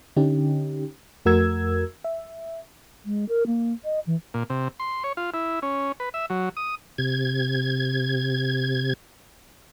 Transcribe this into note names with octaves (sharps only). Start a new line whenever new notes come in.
D3 C#4 D#4 G4
F2 A3 F#4 A#4 E6 G#6
E5
G#3
A#4
A#3
D#5
E3
A#2
C3
C6
C#5
F4
E4
C#4
B4
E5
F#3
D#6
C3 G#6